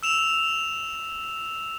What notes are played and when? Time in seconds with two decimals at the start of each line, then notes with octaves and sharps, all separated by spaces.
0.03 E6 E7 F7